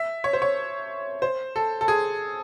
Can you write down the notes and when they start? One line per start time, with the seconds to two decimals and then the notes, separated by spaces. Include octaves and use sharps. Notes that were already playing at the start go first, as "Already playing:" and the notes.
Already playing: E5
0.24 C#5
0.33 C5
0.42 C#5
1.22 C5
1.56 A4
1.81 A4
1.88 G#4